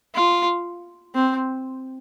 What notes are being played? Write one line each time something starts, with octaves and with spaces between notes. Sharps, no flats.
F4
C4